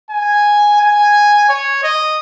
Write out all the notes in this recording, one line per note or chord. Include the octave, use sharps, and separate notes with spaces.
G#5
G#5
C#5
D#5